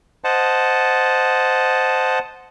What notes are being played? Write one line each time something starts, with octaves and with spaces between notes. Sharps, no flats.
C5 D#5 F#5 A5